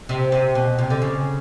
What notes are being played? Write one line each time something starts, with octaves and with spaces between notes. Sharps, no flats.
C3
C3
B2
C3
D3
C#3